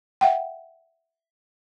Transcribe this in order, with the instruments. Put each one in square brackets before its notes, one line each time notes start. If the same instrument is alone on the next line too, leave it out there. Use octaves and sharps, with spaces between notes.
[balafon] E5 F#5 G5